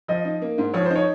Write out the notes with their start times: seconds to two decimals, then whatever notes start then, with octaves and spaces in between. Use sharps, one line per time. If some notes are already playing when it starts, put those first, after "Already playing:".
0.08 F3 D#5
0.25 D#4
0.42 A#3
0.58 G#2
0.74 F3 C#5
0.86 C5
0.90 D#4
0.96 C#5